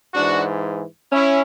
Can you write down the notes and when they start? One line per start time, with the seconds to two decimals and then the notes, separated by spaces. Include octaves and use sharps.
0.14 G#2 E3 D4 F#4
1.12 C#4 E4